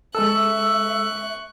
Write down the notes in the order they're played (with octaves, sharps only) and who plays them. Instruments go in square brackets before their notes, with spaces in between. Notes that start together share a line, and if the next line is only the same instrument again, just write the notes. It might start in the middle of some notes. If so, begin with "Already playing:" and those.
[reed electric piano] G#3 A4 [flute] E5 [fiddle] C#6 F#6 [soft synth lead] E6